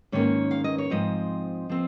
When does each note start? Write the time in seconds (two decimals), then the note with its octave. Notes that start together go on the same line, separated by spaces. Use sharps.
0.12 G#2 D#3 A#3 C#4 C#5
0.51 F5
0.64 D#5
0.78 C#5
0.90 G#2 F3 C4 D#5
1.69 F3 C4